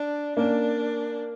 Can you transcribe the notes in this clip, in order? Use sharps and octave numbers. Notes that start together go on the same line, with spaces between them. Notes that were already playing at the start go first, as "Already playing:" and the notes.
Already playing: D4
A#3 C#4 D4